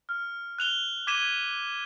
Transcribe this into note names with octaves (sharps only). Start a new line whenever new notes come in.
F6
F#6 F7 G7
D6 G#6 B6 D#7 E7 G7